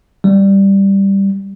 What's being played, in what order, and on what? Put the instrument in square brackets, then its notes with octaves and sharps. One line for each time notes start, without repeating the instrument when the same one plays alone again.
[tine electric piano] G3